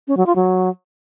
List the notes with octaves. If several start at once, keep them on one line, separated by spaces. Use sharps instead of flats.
C#4
F#3
F4
F#3